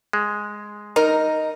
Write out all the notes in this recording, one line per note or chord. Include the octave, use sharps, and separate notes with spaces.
G#3
D#4 A#4